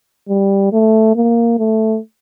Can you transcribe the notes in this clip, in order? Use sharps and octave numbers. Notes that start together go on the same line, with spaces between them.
G3
A3
A#3
A3